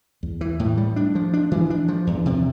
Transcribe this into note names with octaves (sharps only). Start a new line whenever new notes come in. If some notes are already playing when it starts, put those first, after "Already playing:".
E2
E3
A2
G3
D4
F3
D4
E3
D4
F3
E2
C3